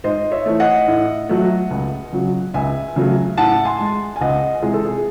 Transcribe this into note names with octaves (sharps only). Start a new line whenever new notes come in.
G#2 C5 D#5
C#5 E5
E3 A3
D#5 F#5
A2
F#3 A3
C#2
C#3 F#3
C#2 E5 G#5
C#3 F#3 A3
A2 F#5 A5
G#5 C6
G#3
G#5
C#2 D#5 F#5
C3 E3 G#3 G#4
A4
G#4